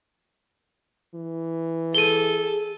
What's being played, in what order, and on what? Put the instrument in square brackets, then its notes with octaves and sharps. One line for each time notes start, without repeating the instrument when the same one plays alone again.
[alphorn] E3
[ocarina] G#4 [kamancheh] A4 [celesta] D#7 G7